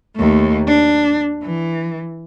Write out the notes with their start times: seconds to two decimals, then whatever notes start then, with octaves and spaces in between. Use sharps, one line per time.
0.16 D#2 A3
0.67 D4
1.43 E3